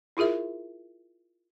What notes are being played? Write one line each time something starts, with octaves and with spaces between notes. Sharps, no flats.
E4 F4 G#4 A#4 E5